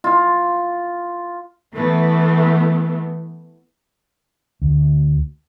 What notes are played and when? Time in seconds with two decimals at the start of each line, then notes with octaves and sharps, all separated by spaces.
0.04 F4
1.75 E3 A3 B3
4.62 D2